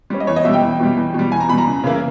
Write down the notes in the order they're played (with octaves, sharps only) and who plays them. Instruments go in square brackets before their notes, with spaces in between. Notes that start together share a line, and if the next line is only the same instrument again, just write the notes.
[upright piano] G3 C#4
D#5
E2 C#5
D#5
B2 E5
G3
G5
E2
B2 G3
E2
B2 G3
E2 G#5
A#5
B2 B5
G3 A#5
C#2
C#3 E3 A#3 E4